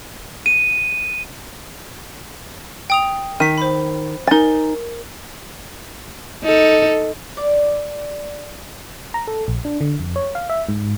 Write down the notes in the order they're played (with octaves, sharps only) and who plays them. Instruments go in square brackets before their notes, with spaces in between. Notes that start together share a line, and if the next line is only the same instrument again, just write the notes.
[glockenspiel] D#7
[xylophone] G5 D#6 F7
[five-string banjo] D#3 [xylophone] B6 D#7
[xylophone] C5 B5
[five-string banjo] D#4 G#5 [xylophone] A#4 A6
[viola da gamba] D#4 A4
[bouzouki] D5
[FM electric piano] A#5
A4
A#1
D4
D3
F2
C#5
F5
E5
G#2